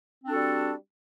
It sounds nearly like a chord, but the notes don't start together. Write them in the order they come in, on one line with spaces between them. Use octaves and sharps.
C4 D4 A4 F#4 G3